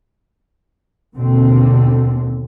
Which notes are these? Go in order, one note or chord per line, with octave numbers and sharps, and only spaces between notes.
D#2 B2 D3 C4